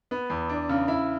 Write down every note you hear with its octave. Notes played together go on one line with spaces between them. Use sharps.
B3
E2
D4
C#3
E4